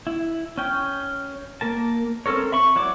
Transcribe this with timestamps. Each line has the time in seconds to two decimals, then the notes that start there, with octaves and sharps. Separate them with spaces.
0.07 E4
0.58 C#4 G5
1.61 A#3 A#4 A5
2.26 C4 C#4 A4 A#4 C#5
2.52 E5 B5 C#6
2.76 F#3 E4 C#5 D5 D6